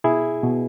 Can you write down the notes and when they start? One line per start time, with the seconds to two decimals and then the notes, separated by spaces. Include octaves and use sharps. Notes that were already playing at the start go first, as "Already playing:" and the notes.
0.04 B2 E4 G#4
0.43 B2